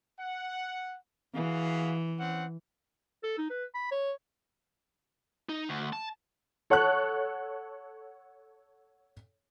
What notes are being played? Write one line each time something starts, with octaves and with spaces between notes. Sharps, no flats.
F#5
E3 F#4 G#4 F5
C4 C#4 F#5
A4
D#4
B4
B5
C#5
D#4
D2
A5
A4 C#5 F#5 A5 C#6 F#6